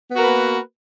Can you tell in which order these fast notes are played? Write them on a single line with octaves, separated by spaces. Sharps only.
B3 F#4 A#4 B4 A#3